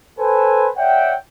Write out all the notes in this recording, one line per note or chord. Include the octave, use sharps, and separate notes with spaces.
A4 B4 C5 G#5
C#5 D5 E5 F#5 G5